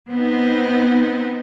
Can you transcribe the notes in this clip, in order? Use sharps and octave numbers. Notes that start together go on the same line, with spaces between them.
B3 C4 D#4